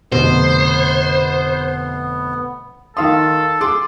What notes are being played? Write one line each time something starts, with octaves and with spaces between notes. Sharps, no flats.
F1 B2 D3 B3 C5
D#3 A4 F5 C6 D#6
G#4 C6 D6